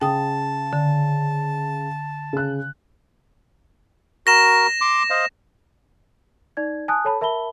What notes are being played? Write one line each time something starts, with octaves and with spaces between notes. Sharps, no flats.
C#3 G5 A5 D#6
D3
C#3 F#6
F#4 A#4 A#6 E7
C6 D6
C5 D#5 F5
D#4 D5 G#6
G#5 A5 D#6 F#6
A4 C#5 A5 B5
A#4 E5 A5 B5 G7